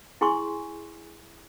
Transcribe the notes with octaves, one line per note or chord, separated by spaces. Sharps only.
E4 G#4 G#5 C6 C#6